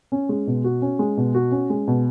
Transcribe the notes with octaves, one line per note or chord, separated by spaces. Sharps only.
C#4
G#3
B2
F#4
C#4
G#3
B2
F#4
C#4
G#3
B2